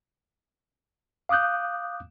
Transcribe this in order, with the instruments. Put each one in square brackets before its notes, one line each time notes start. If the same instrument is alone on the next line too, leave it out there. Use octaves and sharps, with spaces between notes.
[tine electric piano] F5 D6 D#6 F#6 G6